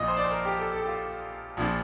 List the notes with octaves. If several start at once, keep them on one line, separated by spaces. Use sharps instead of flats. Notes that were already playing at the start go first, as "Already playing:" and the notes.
Already playing: A#1 A#2 F3 D#5
C5
D5
C5
A#4
G4
A4
A4
G4
F4
A#1 A#2 F3